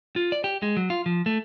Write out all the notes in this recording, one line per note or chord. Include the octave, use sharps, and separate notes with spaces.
F4
D5
G4
G#3
F#3
F4
F3
A3